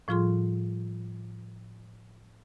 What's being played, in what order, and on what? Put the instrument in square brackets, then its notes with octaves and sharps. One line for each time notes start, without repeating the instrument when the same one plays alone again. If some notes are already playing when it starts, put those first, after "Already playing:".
[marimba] A2 F3 G3 F4 G#4 C6